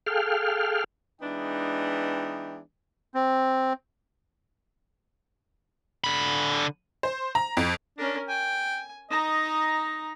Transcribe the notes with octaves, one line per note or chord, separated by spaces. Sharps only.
G#4 A4 F5 G5 F6
E3 G#3 B3 D4 D#4 G5
C4
D3 B5
C5
A#5
F2
C#4 D4 A#4
G5 G#5
D#4 D#5 A#5